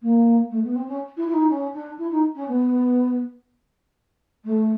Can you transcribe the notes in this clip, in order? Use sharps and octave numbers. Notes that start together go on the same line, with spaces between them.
A#3
A3
B3
C4
C#4
E4
E4
D#4
C#4
D4
E4
D#4
C#4
B3
A3